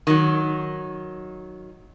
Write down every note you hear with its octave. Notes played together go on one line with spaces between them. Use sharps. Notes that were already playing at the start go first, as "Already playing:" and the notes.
D#3 F#3